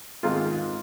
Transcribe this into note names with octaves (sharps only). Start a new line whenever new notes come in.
G#2 D#3 G#3 C4 F4